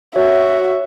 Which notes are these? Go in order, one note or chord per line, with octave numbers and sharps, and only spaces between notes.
F#4 C#5 E5